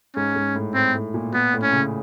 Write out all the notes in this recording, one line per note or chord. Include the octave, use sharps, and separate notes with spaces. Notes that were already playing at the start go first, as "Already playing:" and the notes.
G#2 C#4
G#2
A2
A2 C4
A2
A#2
A#2 B3
A2
C#4
C#3